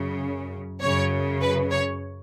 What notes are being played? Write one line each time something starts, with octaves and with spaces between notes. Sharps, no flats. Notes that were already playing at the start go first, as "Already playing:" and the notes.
Already playing: F#2 C#3
F#2 C#3 C#5
B4
C#5